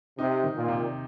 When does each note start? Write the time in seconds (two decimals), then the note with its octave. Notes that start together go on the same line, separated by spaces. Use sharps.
0.18 C3 D#4
0.44 D#3
0.56 A#2
0.68 C3